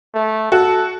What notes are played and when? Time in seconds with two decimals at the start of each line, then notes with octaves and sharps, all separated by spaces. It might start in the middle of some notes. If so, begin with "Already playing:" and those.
0.15 A3
0.52 F#4 A4